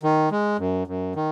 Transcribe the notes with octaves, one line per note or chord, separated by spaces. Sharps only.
D#3
G#3
F#2
F#2
D#3